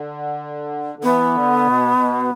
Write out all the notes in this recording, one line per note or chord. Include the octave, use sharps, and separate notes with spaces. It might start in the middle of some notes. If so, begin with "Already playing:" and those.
Already playing: D3
D3
E3 B3
D3
B2
B2